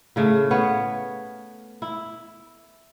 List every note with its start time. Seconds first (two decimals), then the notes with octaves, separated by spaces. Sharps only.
0.16 A2 C#3 A3
0.51 B3 C#5 F5
1.82 E4